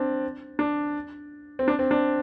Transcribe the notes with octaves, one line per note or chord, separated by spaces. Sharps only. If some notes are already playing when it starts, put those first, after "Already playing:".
Already playing: C4 D4
D4
C4
D4
C4
D4